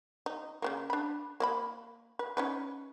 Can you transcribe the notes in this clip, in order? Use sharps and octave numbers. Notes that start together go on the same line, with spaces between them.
D#4
C#3 G3 A#3
D4 B5
A#3 D5 B5
B4
C#4 D#4 B4